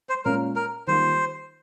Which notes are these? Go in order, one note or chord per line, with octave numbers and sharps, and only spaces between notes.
C5
A#2 G#3 C#4 F4 A#4
A#4
D#3 G3 A#3 F4 C5